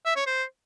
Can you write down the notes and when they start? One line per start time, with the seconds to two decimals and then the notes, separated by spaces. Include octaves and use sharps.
0.06 E5
0.16 C#5
0.27 C5